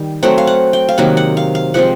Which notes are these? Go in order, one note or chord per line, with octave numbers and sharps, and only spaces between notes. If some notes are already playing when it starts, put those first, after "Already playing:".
Already playing: D#3 G3
F#3 A3 C4 F#5
F5
F#5
G5
F5
C3 D#3 F#3 A#3 F#5
F#5
F5
F5
C3 F3 G#3 C4 F#5